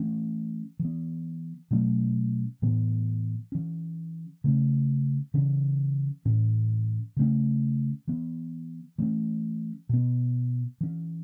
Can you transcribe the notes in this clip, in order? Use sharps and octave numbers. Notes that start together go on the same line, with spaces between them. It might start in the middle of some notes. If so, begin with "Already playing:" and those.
Already playing: E3 A3 C#4
E3
B3
B2 F#3 A3 C#4
A2 E3 B3
E3 C#4
C#3 A3 C#4
C#3 E3 C#4
A2 E3 C#4
C#3 A3 C#4
E3 B3
E3 A3 C#4
B2 B3
E3 C#4